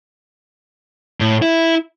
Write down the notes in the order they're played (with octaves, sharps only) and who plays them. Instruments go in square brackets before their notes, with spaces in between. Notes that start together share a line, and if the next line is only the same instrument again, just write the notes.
[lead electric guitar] A2
E4